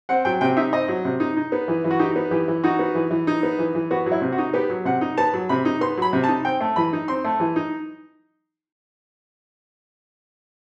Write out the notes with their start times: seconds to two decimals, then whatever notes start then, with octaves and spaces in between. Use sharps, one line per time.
0.09 C4 F#5
0.25 F#3 G5
0.41 C3 G5
0.57 D#4 E5
0.73 C4 D#5
0.88 F#3
1.05 C3
1.20 D#4
1.37 D#4
1.52 B3
1.68 E3
1.84 E3
1.91 F#4
1.99 D#4 G4
2.16 B3
2.31 E3 G4
2.48 E3
2.64 D#4 F#4
2.79 B3
2.95 E3
3.11 E3
3.27 D#4
3.43 B3
3.59 E3
3.75 E3
3.91 B3 F#4
4.06 F#3
4.12 E4
4.22 C3
4.32 F#4
4.38 D#4
4.54 B3 G4
4.70 F#3
4.85 C3 F#5
5.01 D#4
5.18 B3 A5
5.34 F#3
5.49 C3 B5
5.65 D#4
5.81 B3 C6
5.97 F#3 B5
6.13 C3
6.24 A5
6.28 D#4
6.45 C4 G5
6.61 A3
6.76 E3 B5
6.93 D#4
7.08 C4 C6
7.25 A3
7.40 E3
7.56 D#4